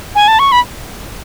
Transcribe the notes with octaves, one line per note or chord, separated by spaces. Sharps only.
G#5
A5
C#6
B5